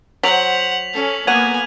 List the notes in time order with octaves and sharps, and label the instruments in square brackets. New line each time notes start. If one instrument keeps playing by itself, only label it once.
[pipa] F#3 [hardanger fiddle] C5 F#5 [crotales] B6 F7 F#7
[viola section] C#4 [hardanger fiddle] A4
[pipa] F#3 F#5 [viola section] A#3 B3 [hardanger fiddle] G#5 [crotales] G#6 D#7 F7